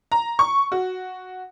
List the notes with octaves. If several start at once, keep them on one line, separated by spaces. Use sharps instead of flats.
A#5
C#6
F#4